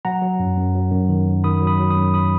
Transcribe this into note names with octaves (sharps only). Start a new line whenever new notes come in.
F#3 F#5 A#5
F#3
F#2
F#2
F#3
F#2
D#3
F#2
D#3 B5 D#6
F#3
B5 D#6
F#3
B5 D#6
F#2
B5 D#6